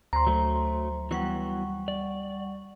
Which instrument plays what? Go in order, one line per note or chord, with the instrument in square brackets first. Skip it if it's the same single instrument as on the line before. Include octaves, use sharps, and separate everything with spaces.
[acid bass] D2 [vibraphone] C5 [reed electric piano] A#5 C6
[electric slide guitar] F#3 A3
[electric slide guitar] E3 F#3 B3 [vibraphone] G3 F#5 C#6
[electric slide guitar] D5